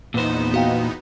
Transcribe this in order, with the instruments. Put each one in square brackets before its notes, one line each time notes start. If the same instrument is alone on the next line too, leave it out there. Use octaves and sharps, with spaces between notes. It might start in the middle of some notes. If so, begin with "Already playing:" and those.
[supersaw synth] E2 B3 D#4 [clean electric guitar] A#2 C5
[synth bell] F#4 F5 G5